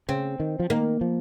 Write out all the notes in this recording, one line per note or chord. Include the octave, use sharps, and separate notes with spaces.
C#3 C4
D#3
F3
D#3 A#3
F3